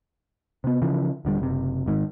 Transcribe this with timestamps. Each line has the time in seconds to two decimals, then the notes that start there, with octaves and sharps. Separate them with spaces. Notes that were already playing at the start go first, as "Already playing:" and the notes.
0.64 C3 B3
0.82 C#3 E3 F3
1.25 D#1 D3 G3
1.40 F#1 C3
1.86 G#1 G#2 D3 D#3